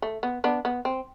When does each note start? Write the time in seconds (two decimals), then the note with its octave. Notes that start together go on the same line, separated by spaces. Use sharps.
0.02 A3
0.23 B3
0.44 B3 D4
0.65 B3
0.85 C4